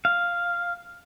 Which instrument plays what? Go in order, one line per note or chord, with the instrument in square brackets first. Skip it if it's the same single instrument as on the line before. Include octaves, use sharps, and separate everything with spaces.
[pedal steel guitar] F5